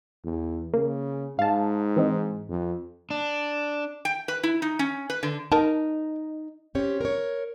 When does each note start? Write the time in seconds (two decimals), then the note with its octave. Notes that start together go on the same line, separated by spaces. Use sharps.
0.24 E2
0.74 C#3 A#3
1.39 G#2 F5 A5
1.96 E3 C4 D#4
2.49 F2
3.10 D4
4.05 G5
4.28 B4
4.43 E4
4.62 D#4
4.79 C#4
5.10 B4
5.23 D3
5.52 D#4 A#4 A5
6.75 C4 C#4 G4 C#5
7.01 A#4 C#5